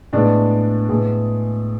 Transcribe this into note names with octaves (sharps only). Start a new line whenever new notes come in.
A2 G#3 B3 D4
A2 G#3 B3 G#4